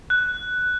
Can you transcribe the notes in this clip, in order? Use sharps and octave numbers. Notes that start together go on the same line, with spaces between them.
F#6